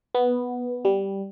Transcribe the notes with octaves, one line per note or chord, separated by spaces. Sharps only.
B3
G3